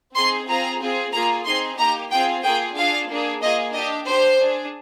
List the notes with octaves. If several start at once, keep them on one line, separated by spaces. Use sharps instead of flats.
C4 D#4 G#4 C6
C4 F4 G#4 A#5
C4 F4 G#4
A#3 F4 G#4 A#5
C4 D#4 G#4 C6
A#3 D#4 G4 A#5
C4 F4 G#4 G5
A#3 F4 G#4 G5
D4 F4 G#4 F5
A#3 D4 G#4
A#3 F4 G#4 D#5
D4 G4 D#5
D4 G4 C5
D4 G#4